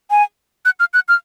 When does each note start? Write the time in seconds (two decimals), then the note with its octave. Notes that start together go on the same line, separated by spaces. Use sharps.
0.10 G#5
0.65 F#6
0.79 F6
0.94 F#6
1.08 F6